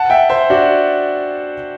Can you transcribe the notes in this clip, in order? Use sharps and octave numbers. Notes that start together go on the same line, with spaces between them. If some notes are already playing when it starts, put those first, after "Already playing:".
Already playing: F#5 A5
E5 G5
C5 E5
D4 F#4